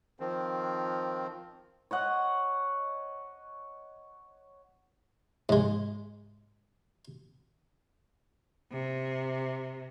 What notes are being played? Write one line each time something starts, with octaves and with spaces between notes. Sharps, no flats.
D#3 F3 C4
C#5 D#5 F#5
G#2 G#3
C3